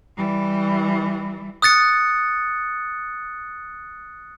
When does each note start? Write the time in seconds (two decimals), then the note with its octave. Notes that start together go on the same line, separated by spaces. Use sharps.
0.18 E3 G3
1.62 D#6 F#6 A6 C#7